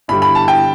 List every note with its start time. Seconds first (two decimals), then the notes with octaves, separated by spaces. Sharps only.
0.08 G1 G2 D3 G3 B5
0.22 B5
0.35 A5
0.48 G5